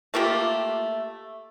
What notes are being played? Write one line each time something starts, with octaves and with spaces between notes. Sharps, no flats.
A3 A#3 F4 G4